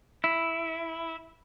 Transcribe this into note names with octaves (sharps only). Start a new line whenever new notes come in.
E4